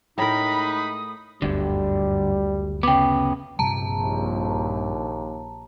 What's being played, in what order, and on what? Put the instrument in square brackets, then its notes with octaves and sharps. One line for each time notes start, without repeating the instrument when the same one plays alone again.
[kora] A2 A#4 [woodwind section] G#3 D#4 [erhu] B5 [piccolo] D#6
[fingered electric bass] F#1 D2 [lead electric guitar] G2 D3 [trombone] G3
[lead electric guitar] C#3 B3 [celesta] G5 D6
[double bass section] A#1 [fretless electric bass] G2 C3 G3 [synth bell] A5 A#5
[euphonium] D#2